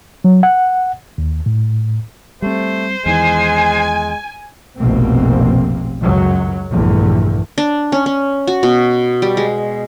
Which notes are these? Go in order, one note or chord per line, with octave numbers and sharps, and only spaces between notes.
F#3
F#5
D#2
A2
G3 A3 C4 C5
E2 D#3 E3 G#3 G#5
F1 A#1 B2 A#3 C4
C#2 F#2 F#3
A#1 E2 G2 A#2 D3 A3
D4
C#4
C#4
F#4
B2
G3
G#3